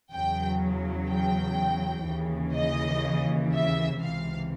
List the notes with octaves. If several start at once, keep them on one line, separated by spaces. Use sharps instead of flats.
E2 C#3 F#3 G5
G5
D#2 C#3 E3
D#5
E5
C#2 C3 E3 F5